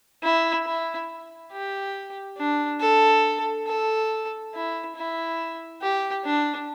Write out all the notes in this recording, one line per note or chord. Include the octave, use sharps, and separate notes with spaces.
E4
E4
G4
D4
A4
A4
E4
E4
G4
D4